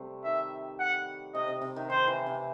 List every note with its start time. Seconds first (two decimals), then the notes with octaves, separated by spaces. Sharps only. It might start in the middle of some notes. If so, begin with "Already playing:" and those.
Already playing: C3 G3 A3
0.24 D#3 E5
0.80 F#5
1.35 C3 D#5
1.48 C3
1.61 C3
1.76 D#3
1.90 D#3 C5
2.08 E3
2.26 C3